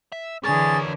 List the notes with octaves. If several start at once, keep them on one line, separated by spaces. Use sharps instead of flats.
E5
D3 E3 G#4 A#4 C#5 A6